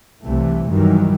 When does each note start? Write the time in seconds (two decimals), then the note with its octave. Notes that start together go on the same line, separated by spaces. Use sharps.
0.23 C2 C3 E3 A3
0.71 G2 D#3 E3 F#3 G3